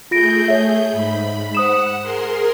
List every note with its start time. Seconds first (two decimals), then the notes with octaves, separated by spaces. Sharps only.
0.11 A3 F4 G#4 G6 A#6 D7
0.48 C#5 E5
0.90 G#2 B5
1.55 C5 F#5 D#6 E7
2.02 G#4 A#4 C6